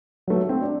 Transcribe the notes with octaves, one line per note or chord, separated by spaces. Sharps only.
F#3 A3
C4
D4